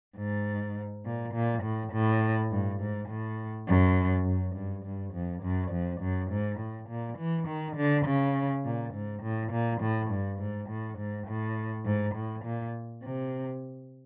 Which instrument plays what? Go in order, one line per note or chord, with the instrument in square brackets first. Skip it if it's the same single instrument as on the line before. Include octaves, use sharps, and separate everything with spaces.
[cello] G#2
A#2
A#2
A2
A2
G2
G#2
A2
F#2
F#2
G2
G2
F2
F#2
F2
F#2
G#2
A2
A#2
E3
D#3
D3
C#3
A#2
G#2
A2
A#2
A2
G2
G#2
A2
G#2
A2
G#2
A2
A#2
C3